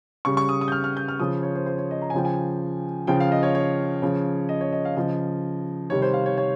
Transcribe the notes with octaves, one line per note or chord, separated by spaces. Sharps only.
C#3 G3 C#6
C#6
D#6
D#6
G6
F6
F6
G6
F6
C#3 F3 D#6
C#5
C5
C5
C#5
D#5
A#5
G#5
C#3 F3 G5
G#5
C#3 F3 G5
F5
D#5
C#5
C#5
C#3 F3
D#5
C#5
D#5
F5
C#3 F3 D#5
C3 D#3 G3 C#5
C5
F5
C#5
C#5